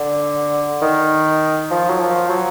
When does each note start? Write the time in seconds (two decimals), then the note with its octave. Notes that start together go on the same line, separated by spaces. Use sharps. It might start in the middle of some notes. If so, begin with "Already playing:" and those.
Already playing: D3
0.81 D#3
1.71 F3
1.89 F#3
2.00 F3
2.30 F#3